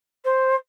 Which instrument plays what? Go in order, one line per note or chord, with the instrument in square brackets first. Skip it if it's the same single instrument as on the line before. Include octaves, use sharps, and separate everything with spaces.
[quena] C5